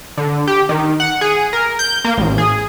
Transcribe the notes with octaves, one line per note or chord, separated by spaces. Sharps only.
D3
G4
D#3
F#5
G#4
A#4
G6
A#3
A1
G#4